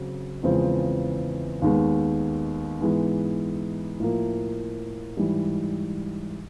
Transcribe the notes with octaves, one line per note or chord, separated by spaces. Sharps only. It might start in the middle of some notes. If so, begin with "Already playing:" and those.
Already playing: C#3 F#3 C4
E2 C#3 F3 G#3 C4
D#2 D#3 G#3 B3
G#2 E3 G#3 B3
A2 F3 A#3
G#2 E3 G3